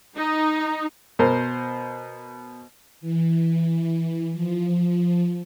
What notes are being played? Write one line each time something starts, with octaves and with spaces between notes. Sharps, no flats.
D#4
B2 A#4 C5
E3
F3